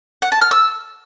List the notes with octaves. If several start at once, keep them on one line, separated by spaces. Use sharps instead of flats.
F#5
A5
F6
E6